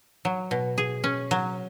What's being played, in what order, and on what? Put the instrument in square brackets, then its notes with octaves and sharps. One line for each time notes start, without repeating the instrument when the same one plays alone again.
[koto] F#3
B2
G#4
C#4
F#3